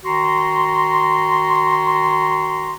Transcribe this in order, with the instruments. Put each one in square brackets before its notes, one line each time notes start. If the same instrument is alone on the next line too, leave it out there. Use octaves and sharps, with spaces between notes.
[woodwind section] D#3 F#4 A#5 C6